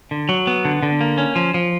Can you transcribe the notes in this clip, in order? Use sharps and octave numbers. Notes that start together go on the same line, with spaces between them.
D3
F#3
B3
D3
D3
A#3
C#4
F3
F3